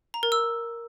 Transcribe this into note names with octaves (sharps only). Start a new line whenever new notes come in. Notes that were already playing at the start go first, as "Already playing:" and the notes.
A#5
A#4
E6